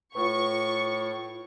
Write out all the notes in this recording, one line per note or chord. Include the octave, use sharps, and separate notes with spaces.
A2 F4 B4 C#6